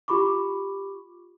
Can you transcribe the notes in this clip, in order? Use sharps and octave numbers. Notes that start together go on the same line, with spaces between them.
F4 G4 B5 C#6 D6